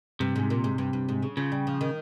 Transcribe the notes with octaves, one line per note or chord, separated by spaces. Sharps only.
G2 C3
G#2
A#2
G#2
G2
G2
G#2
C#3
C#3 F3
G3
F3
D#3